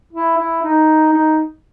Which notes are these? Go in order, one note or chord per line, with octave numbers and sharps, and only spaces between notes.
E4
E4
D#4
D#4